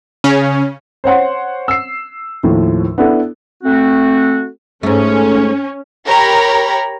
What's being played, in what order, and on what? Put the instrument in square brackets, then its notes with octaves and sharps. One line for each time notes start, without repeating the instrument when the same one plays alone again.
[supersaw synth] C#3 C#4
[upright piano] C5 C#5 F#5 C6
E6 C7
D#2 A2 F3
B3 D4 E4 A4
[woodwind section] A3 C4 F#4
[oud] G#2 A3 [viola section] C#4
[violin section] G4 A#4 C#5 A#5 B5